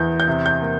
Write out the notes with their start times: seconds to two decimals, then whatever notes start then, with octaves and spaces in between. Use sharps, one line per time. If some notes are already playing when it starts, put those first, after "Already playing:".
Already playing: E2 E3 G6
0.20 G6
0.28 C3
0.46 G6
0.62 A#3